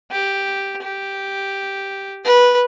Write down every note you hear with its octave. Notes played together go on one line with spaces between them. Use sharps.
G4
G4
B4